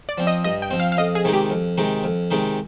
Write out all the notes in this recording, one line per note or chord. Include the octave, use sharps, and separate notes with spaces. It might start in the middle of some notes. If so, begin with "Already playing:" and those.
D5
F3 C4
D#5
G2 D#5
G5
F3 C4
F5
F5
F2 D#5
G#4
C3 D#3 G#3 D#4
G4
F2
C3 D#3 G#3 D#4
F2
C3 D#3 G#3 D#4